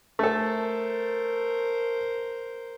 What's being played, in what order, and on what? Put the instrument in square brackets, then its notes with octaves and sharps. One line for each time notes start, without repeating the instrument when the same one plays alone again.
[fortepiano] A3 A4 [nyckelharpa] A#4 C5